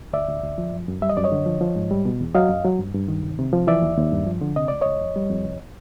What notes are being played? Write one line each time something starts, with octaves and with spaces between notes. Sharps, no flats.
D2 D5 E5
D2
D2
F3
F#2
F#2
G3 E5
D#5
F#2 D5
C#5 D#5
D3
F3
F3
G#2
G3
B2
E2
F#3 D#5 F5
F#2
F#3
G2
G2
D#3
C2
C3
F3
E3 D5 E5
D#2
D#2
G2
F3
D3
C3 D#5
C#2 D5
C#2 C#5 D#5
F2
G3
F2
C2